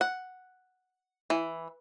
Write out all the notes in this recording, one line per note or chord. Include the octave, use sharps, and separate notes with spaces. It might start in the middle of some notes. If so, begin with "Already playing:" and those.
F#5
E3